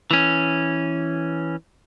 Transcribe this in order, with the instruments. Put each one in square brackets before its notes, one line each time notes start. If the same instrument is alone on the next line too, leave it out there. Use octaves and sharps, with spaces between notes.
[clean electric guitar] E3 C#4